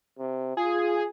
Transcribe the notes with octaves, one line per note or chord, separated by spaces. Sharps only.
C3
F4 G#4